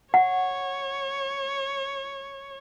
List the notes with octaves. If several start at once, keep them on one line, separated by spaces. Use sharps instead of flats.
C#5 F#5